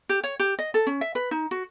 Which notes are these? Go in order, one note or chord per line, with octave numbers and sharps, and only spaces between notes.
G4
C#5
G4
D#5
A4
C#4
E5
B4
D#4
F#4